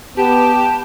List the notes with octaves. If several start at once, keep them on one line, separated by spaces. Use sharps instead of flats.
B3 G4 A5